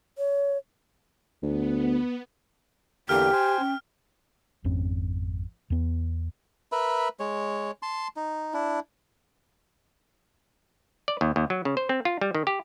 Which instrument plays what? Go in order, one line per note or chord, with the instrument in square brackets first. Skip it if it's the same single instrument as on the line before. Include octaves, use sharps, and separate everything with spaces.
[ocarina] C#5
[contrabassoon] D2 [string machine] B3
[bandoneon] E2 D3 A#3 [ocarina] G4 [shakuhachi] G5 [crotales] F6
[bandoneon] C5 G#5
[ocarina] C#4
[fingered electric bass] G#1 F2 C4 C#4
E2 B3
[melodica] A#4 B4 E5 B5
G#3 C#5
A5 C6
D#4
D4 E4
[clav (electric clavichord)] D5
D#2
D#2
F#3
C#3
C5
C4
F4
G3
D#3
G4